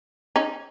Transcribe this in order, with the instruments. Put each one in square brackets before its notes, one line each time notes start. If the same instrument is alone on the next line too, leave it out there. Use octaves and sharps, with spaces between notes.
[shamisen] C#4 D#4